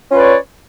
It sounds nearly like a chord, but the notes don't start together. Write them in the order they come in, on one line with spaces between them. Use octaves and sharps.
C#4 F4 B4 D5 C#5